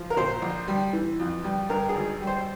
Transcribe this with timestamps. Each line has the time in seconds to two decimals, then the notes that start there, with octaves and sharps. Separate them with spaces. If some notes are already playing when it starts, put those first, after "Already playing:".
Already playing: F3
0.10 A#4
0.17 A#2 C5
0.42 A#1
0.68 G3
0.93 E3
1.19 F2
1.44 G3
1.69 G2 A#4
1.89 G#4
1.95 G#1
2.21 G3
2.27 C5